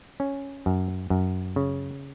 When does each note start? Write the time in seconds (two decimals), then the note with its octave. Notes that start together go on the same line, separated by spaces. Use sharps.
0.20 C#4
0.66 F#2
1.10 F#2
1.56 C#3